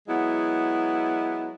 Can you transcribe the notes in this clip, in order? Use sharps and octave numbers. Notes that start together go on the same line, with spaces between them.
F#3 G#3 B3 E4